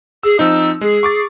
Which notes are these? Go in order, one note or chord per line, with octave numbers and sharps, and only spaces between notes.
G#4 E6
F3 C4 D#4 E6
G#3 G#4
C#6 D6 A6